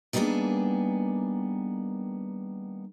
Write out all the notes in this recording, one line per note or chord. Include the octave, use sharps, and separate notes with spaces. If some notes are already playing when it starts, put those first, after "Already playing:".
D#3 G3 A#3 B3 D4 G#4